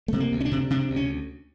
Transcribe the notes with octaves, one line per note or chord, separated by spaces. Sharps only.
C3 A3
A#3
D2
C#4
D4
C3
C3 D4
D2
C#4